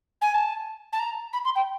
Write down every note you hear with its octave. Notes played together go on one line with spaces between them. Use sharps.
G#5
A5
A5
A#5
B5
C6
G5